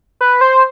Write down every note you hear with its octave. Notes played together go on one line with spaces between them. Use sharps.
B4
C5